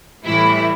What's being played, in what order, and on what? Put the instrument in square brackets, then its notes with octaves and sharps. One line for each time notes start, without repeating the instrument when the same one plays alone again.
[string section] A2 E3 G3 E4